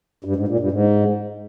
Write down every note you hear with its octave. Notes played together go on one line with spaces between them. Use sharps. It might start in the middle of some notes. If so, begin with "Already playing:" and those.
G2
G#2
A#2
G2
G#2